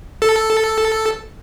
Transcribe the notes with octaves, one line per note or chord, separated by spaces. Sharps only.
A4